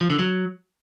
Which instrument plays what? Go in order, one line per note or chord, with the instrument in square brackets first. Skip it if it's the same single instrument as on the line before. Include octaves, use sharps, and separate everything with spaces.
[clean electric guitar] F3
D3
F#3